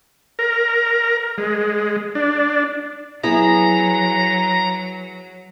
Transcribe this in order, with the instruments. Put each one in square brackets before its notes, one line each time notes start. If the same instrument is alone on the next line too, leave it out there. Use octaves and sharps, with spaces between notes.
[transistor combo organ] A#4
G#3
D4
[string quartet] F#3 [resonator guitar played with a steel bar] B3 E4 G#4 [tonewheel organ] A#5